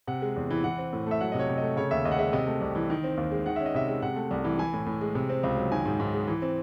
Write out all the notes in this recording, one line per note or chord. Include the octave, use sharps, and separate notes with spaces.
C3 F#5
G#3
E2
E3
E3 F#5
C4
A2
A3 E5
F#3 F#5
C3 D#5
C#5
C3
A3 D#5
C#3 C#5
D#2 E5
D#2 D#5
F#5
G#3 E5
C3 D#5
A3
C2
E3
D#3
C4
D#2
G#3
D#3 F#5
C#4 E5
D#5
C3 E5
G#3
C3 F#5
A3
C2
E3
E3 G#5
A2
A2
G#3
C3
C4
C#2
F#3
D#3 G#5
G#2
G#2
G#3
E3
C4